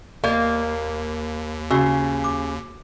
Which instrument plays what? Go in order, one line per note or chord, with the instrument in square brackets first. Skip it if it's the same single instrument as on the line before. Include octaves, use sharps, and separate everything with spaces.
[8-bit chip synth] D#2 [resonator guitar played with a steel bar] A#3 [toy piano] D5 D#5
[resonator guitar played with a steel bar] C#3 [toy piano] F#4 C#6 E6
[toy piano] D6